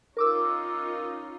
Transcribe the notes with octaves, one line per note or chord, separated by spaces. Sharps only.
C#4 D#4 F4 A#4 D6 E6